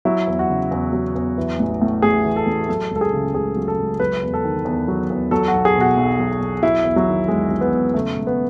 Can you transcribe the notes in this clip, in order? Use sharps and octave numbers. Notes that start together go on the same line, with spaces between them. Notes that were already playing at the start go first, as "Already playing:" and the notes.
F#3 E4
E2
F#4
C#3
E2
F#3
E2
E3
A1
A2
A1 G#4
E3
A4
A1
F#3 A4
C#2 A4
G#4
C#3
C#2 G#4
F#3
A4
C#2
F#3 B4
E2
A4
D#3
E2
F#3
E2
F#3 A4
F#4
B1
G#4
B2 F#4
B1
F#3
B1
F#3 E4
E2
F#3
D#3
E2 G#3
F#3
B3
E2
C#3 A3
E1
B3